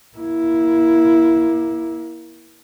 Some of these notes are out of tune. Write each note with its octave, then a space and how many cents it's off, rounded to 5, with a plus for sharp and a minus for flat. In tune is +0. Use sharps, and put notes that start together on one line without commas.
A#3 +25 E4 +0